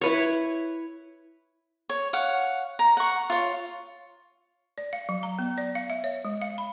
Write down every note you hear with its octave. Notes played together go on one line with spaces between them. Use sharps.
E4 B4 C#5
C#5
C#5 F5 F#5
A#5
F#5 C#6
F4 C#5
D5
F5
F#3
A#5
B3
D5
F5
E5
C#5
G#3
F5
B5